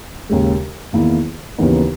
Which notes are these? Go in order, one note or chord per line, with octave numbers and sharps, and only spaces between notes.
D#2 C#3 G#3
E2 D#3 A#3 E4
D#2 C#3 E3 B3 D#4